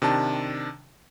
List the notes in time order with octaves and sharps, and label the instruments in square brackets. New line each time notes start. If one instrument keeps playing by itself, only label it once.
[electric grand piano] C3 D#3 D4 A5